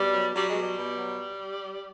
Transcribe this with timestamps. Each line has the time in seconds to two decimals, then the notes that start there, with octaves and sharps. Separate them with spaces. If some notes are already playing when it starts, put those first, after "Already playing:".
Already playing: B2 G3
0.13 F#3
0.34 F#3 G3
0.48 G#3
0.55 B2
0.60 G3
0.76 B2
0.97 F#3